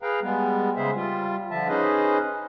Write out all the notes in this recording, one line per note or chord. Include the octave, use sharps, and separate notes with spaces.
G#4 B4 F5 G5 A#5
G3 G#3 B3
C#3 G#3 G#4 C5 E5
G3 F4
D3 F3 E5 A5
C#4 D#4 G#4 B4 C5 D#5